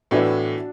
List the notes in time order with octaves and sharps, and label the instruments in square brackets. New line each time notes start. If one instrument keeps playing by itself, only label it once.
[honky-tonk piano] A2 E3 B3 E4 [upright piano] D4 F#4